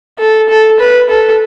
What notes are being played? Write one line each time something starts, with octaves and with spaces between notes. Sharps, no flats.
A4
A4
B4
A4